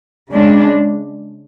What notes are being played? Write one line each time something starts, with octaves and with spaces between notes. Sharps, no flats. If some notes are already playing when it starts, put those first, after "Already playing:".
C#3 G#3 D4